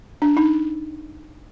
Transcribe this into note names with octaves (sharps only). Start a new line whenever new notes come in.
D4
D#4